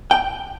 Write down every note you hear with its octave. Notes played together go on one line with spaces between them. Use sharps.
G5